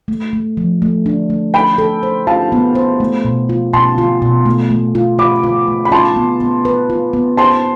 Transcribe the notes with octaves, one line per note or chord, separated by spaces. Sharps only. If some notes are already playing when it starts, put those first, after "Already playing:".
A3
A3
F3
A3
D4
A3
A4 G5 B5
A4
C5
F4 F5 A5
B3
C5
A3
B2
F4
B2 A5 C6
F4
B2
A3
A3
F4
F4 B5 D6
F4
A3
B5
F4 A5 C6
B3
B3
B4
F4
B3
C5 A5 C6